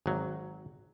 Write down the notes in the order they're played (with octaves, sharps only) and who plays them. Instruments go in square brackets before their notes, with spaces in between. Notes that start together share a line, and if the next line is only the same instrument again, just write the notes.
[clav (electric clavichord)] G#1 F#3